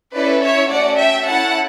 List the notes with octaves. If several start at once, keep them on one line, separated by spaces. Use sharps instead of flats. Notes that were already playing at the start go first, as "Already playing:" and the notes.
C#4 E4 A4 B4 D5
C#5 E5
A3 C#4 F#4 D5 F#5
E5 G5
C#4 E4 A4 F#5 A5